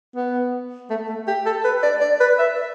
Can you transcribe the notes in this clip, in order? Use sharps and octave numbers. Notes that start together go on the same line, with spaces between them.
B3
A3
A3
G4
A4
B4
D5
D5
B4
E5